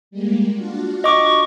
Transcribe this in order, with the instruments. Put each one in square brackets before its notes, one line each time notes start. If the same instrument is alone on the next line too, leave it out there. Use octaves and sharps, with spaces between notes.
[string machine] G3 G#3 A#3
D4 F4 F#4
[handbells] D#5 D6 [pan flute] C#6